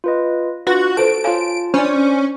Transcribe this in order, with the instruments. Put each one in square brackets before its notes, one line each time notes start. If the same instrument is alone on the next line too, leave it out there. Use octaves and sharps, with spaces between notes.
[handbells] F4 B4 D#5
[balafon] D4 B4 [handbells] F4 [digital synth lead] F#4
[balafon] A4 B4 C5 [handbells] A5 [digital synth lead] D7
[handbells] F4 A5 [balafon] C#5 F5 G#5
[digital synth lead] C#4 [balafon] D4 [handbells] C5 D5